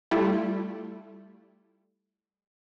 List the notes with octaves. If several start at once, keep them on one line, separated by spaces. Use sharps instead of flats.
G3 A3 E4 F4